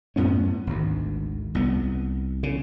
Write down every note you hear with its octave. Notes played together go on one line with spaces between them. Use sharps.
F#2 A2 B3 C#4
G#1 D2
C2 B3
C#3